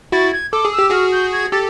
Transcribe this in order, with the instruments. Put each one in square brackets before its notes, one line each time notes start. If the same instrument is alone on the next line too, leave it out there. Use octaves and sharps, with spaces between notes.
[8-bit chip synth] E4 F#4 [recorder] A6
[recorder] G#6
[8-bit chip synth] A4 [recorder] D6
[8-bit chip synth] G#4
[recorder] E6
[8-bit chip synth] G4
[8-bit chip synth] F#4 G#4 [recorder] F6
[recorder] G6
G#6
[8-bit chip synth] G4 A4 [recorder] A6